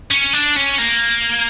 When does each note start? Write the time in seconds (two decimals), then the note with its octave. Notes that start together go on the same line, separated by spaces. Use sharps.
0.11 C#4
0.33 D4
0.56 C#4
0.78 A#3